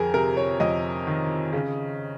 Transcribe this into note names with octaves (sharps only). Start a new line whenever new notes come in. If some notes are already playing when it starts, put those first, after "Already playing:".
Already playing: F2 G#4 A#4
C3 A#4
C#5
F2 D#5
D#3
C#3